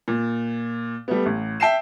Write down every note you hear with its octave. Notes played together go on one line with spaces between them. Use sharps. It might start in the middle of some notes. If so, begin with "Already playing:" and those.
A#2
G3 A3 B3
A1
E5 G5 A5 C7 E7